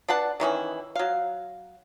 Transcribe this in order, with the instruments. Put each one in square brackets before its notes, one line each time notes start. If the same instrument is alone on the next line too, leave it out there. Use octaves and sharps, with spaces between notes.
[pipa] D4 B4 F#5 A5
D#3 E3 C#4 E4
F#3 F5